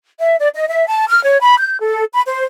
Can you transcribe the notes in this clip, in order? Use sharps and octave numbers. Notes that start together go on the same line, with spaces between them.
E5
D5
D#5
E5
A5
F6
C#5
B5
G6
A4
B5
C5